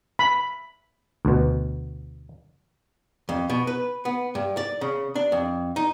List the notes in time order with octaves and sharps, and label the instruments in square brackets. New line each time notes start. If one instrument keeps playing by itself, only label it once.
[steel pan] B5
[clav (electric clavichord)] D2 B2
[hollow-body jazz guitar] F2
B2
B4
B3
G2
D5
C#3
D4
F2
D#4